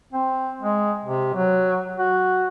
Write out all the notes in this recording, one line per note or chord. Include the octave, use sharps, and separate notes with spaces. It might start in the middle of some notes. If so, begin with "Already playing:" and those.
C4
G#3
C3
F#3
F#4